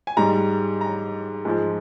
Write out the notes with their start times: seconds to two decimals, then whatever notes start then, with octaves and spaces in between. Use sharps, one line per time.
0.07 G#5
0.17 G#2 G3 A#5
0.81 A#5
1.45 G#2 F3 G#3